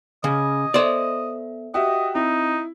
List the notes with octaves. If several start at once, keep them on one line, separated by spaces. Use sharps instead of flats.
C#3 D#5 D6 G#6
B3 A4 C5 D5 E5
F#4 G4 D#5 E5 G5
C4 D#4 E4